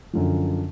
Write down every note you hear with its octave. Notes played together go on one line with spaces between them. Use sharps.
F#2 D3 F3